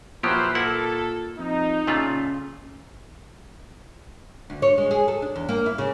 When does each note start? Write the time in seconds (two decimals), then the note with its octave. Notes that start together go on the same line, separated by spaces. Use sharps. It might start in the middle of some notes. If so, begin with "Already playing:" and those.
0.23 A#2 F3 F#3 E4 G4 B4 C5
0.55 A#3 E4 A4 F#5
1.38 F2 D#4
1.87 A#2 C#3 A3 F4
4.50 D2
4.62 C#5
4.78 G#3
4.91 G#4
5.08 A4
5.22 D4
5.36 E2
5.49 A#3
5.66 E4
5.78 C#3